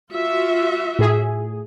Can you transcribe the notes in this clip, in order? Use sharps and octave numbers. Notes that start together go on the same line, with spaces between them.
F4 F#4 E5
A2 G#4